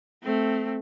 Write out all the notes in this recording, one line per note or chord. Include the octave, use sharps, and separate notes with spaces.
A3 C4